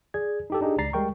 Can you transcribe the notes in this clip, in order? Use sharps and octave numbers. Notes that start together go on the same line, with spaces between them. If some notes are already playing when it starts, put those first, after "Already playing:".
G#4 D5 G#6
D#4 G4 A4
D4 D#4 G4 G#4
C#2 D5 A#5 A6 C7
G3 G#3 A#4 G5 C#6